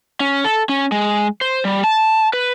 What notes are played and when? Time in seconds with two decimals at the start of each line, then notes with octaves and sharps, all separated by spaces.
0.20 C#4
0.44 A4
0.69 C#4
0.92 G#3
1.41 C5
1.65 G3
1.84 A5
2.33 B4